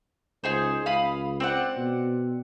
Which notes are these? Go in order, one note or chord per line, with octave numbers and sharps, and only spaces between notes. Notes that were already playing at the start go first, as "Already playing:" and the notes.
C#2 D#4 G#4 C5
C#2 F5 B5 D#6
C4 D5 F#5
B2